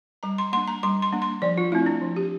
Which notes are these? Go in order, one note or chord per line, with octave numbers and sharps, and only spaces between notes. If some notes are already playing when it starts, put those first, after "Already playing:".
G3 A#5
C6
A#3 D4 C6
A#5
G3 C6
C6
A#3 D4
C6
F3 D5
F4
A3 C4 E4
D4
F3
G4